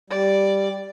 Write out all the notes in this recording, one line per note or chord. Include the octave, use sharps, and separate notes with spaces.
G3 D5